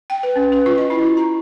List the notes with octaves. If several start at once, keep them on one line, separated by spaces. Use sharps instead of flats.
G5
B4
C#4
B4
F4
D#5
E4
F#4
A#5